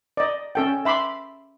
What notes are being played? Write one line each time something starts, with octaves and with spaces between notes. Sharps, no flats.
D5 D#5
C#4 A4 G5
E5 B5 C6 D6